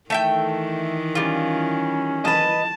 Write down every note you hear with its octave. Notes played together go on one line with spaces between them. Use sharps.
D#3 E3 A3 E5 G5
G3 C#4 F4
B4 D#5 A5